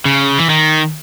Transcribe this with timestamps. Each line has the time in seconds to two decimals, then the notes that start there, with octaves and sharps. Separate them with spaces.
0.05 C#3
0.39 E3
0.50 D#3